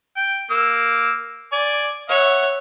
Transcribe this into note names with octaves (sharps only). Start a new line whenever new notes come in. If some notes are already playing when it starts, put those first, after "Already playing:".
G5
A#3 E6
D5 G#5
C#5 E5 F#5